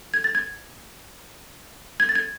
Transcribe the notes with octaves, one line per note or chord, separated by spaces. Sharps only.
G#6
A6
G#6
G#6
A6
G#6